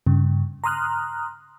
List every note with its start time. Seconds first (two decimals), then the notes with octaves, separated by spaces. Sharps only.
0.07 G2 C#3
0.64 A#5 C6 D#6 F6 F#6